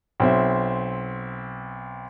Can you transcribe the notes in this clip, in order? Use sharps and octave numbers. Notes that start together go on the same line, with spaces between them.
B1 C4 E5